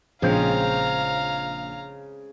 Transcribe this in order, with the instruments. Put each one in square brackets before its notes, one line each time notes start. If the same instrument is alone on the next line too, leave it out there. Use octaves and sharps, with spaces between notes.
[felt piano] A#1 G6 [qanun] C#3 G#3 C4 [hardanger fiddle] F5 A#5